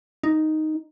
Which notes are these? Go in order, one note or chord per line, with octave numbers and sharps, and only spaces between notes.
D#4